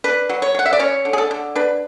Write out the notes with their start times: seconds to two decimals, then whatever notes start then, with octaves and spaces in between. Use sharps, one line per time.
0.04 D4 B4
0.29 F#3
0.42 C#5
0.55 F#3 F#5
0.66 E5
0.73 D5
0.79 C#4 C#5
1.05 D3
1.13 G#4
1.18 A4
1.31 D3
1.55 D4 B4